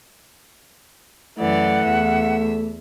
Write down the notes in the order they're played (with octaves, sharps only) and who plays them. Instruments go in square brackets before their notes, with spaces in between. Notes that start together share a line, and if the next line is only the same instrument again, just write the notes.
[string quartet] F#2 E3 D5 [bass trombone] A3 [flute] F#5
[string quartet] E2 E5